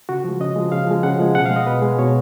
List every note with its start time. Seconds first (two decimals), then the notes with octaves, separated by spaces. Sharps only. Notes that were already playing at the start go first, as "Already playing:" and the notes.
0.09 C#3 F#4
0.24 F3 G#3
0.40 C#3 D#5
0.56 F3 G#3
0.72 C#3 F5
0.88 F3 G#3
1.03 C#3 F#5
1.19 F3 G#3
1.35 B2 F#5
1.45 F5
1.51 G#3
1.56 D#5
1.67 B2 B4
1.82 G#3
1.98 B2 C#5